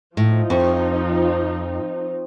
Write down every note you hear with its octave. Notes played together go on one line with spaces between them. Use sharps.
A2 F3 D#4
F2 C4 C#6